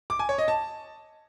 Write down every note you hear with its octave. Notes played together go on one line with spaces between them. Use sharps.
D6
G#5
C#5
D#5
A5